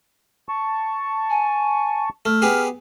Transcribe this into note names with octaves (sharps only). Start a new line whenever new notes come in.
A5 C#6
G#5
A3 F6
B3 G4 G#4